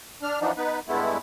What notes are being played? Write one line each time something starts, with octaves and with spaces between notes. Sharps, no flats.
D4 F6
E3 F3 B3 D4 D#4
B3 D#4 B4
G2 G#3 A3 B3 E4